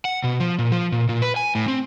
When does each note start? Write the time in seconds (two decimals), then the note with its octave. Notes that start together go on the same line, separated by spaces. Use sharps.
0.05 F#5
0.24 B2
0.40 F3
0.59 A#2
0.72 F3
0.92 A#2
1.09 A#2
1.22 B4
1.36 G#5
1.55 A2
1.68 C4